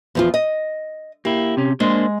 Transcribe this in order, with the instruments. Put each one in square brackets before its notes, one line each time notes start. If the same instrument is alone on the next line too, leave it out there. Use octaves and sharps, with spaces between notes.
[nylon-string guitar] E2 F3 F4
D#5
[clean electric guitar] A#3 E4 [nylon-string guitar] G4
[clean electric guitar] C3 C#4
[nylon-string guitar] G#3 [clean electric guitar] A#3 D4 C5